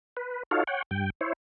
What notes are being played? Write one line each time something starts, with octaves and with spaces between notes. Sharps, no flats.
B4
D#4 F4 F#4 A4 C#5 F5
C#5 F#5 G5
G2 G5
E4 C5 C#5